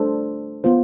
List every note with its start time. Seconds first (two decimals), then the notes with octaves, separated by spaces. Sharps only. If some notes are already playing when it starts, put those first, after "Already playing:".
Already playing: A3 D4 A4 C5
0.64 B3 F4 C5